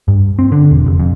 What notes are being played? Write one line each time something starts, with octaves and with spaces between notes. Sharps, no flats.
G2
C4
D3
E1
F1
F2